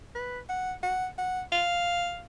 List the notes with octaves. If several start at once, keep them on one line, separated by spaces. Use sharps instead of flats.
B4
F#5
F#5
F#5
F5